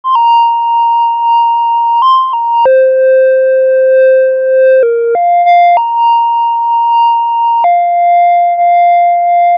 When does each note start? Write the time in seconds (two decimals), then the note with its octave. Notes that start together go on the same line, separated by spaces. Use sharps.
0.04 C6
0.15 A#5
2.02 C6
2.33 A#5
2.65 C5
4.83 A#4
5.15 F5
5.45 F5
5.77 A#5
7.64 F5
8.57 F5